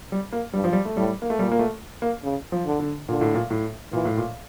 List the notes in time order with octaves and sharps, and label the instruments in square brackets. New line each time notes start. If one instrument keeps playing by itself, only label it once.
[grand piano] G3
A#3
[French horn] G2 [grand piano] G3
[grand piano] F3
G3
A3
[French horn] A2 [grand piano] G3
[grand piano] A#3
A3
[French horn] A#2 [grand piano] G3
[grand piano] A#3
A3
A#3
[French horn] C#3
[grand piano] F3
[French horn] D3
[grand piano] D3
[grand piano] A#2 [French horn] D3
[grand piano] A2
A#2
A2
[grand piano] A#2 [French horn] E3
[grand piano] A2
A#2